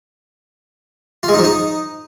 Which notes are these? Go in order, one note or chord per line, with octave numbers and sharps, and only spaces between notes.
F4
G#3
D#4
F3
D#4